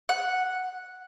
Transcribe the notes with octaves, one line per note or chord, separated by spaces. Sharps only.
F#5